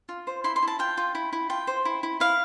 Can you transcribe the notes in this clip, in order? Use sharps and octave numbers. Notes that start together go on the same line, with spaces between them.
F4
C5
E4 C6
C6
E4 A5
F4 G5
F4
E4
E4
F4 G5
C5
E4
E4
E4 F5